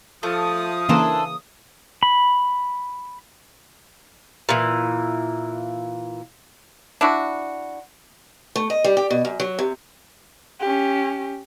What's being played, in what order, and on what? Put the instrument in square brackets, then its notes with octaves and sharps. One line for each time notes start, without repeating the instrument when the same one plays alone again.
[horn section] F3 [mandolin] A3 [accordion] D#6
[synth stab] C#3 E3 A#3 [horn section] D4 G#4 [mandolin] E4 A4 C5
[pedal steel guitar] B5
[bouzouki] A#2 E3
[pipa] D4 E4 F#4
[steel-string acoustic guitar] A3
D#5
G3
G4
B2
F#2
F#3
C3
[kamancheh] C#4 G4